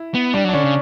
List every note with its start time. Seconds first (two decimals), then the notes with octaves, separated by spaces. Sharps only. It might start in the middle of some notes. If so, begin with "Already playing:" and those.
Already playing: E4
0.14 B3
0.34 G3 D4
0.44 F#3 D4
0.53 D3 C#4
0.64 C#3